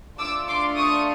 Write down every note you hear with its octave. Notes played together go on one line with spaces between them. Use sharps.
A3 D4 F4 A4 D6 E6
C6 D6
C#6 D#6